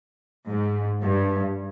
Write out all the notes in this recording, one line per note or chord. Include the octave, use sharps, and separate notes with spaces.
G#2
G2